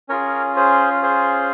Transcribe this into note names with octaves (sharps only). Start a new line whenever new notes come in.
C#4 F4 G#4 A#4 C#5
G#4 C5
G#4 C5